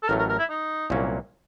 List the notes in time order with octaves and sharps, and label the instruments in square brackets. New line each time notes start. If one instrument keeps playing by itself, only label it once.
[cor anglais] A4
[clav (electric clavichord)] A1 A2 F#3 A3 [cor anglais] A#4
[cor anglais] A#4
A#4
E4
D#4
[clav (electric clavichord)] C2 A#2 F#3 A#3 C#4